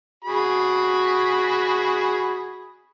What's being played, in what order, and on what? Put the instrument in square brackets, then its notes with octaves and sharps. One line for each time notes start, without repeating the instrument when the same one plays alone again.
[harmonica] F#4 G#4 B5